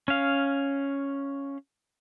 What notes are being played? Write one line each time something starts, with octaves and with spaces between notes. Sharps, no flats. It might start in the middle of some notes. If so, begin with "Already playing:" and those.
C#4 F5